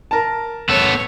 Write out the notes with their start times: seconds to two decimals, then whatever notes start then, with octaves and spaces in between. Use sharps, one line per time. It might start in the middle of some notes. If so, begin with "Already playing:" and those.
0.11 A#4 A5
0.69 B3 A4 C#5